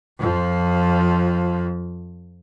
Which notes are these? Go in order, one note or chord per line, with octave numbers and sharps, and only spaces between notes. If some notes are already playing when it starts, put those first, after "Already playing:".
F2 F3